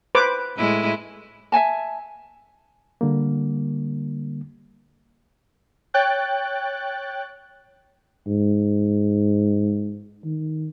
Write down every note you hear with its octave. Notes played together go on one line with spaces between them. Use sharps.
B4 C5 D6
A2 G#3 E4
E5 F#5 G#5 A5
D3 G3 A#3
C#5 G5 F#6 A6
G#2
D#3